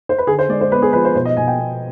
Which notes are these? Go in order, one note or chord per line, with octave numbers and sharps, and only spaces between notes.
C5
B4
D3 G#4
C5
G#3 D5
C5
B3 B4
G#4
F3 B4
C5
B2 C5
D#5
B2 G#5
G5
B3